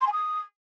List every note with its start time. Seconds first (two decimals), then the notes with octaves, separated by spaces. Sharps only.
0.01 C6
0.07 G#5
0.12 D#6